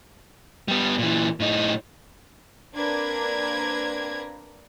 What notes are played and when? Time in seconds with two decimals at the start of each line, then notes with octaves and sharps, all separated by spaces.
0.68 G3 B3
0.98 A#2 E3
1.40 A2 D#4
2.76 A#3 C4 D4 A#4 B4 G#6